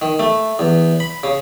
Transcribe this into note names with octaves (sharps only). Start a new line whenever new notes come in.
D#3
A3
E2
B5
C#3